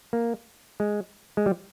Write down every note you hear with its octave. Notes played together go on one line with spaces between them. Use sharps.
A#3
G#3
G#3
G3